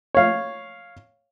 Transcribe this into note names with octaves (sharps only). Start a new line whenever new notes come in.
C#5 F5